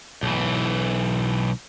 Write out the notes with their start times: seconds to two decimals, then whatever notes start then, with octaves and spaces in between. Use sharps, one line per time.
0.23 B1 E3